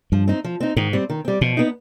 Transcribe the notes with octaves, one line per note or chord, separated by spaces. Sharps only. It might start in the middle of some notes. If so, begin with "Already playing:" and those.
G2 F3
C4 D#4
F3
C4 D#4
G#2 D#3
G3 C4
D#3
G3 C4
B2 F3
B3 D#4